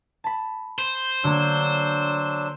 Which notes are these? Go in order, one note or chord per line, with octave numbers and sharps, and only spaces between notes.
A5 B5
C5
D3 F#3 A#3 D4 E6